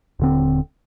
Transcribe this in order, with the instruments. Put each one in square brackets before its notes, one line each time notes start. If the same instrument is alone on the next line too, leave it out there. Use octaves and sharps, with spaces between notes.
[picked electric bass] D#1 D3 C4